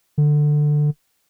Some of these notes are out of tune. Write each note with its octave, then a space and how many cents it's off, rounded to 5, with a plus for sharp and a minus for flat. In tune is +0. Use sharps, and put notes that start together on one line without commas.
D3 +15